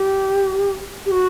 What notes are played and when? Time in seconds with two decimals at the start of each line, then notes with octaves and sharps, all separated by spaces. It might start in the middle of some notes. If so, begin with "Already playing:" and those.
Already playing: G4
1.06 G4
1.11 F#4